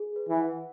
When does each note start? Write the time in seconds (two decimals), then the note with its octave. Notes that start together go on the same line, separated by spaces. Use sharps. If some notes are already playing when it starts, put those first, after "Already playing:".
Already playing: G#4
0.16 B4
0.29 E3
0.40 F#5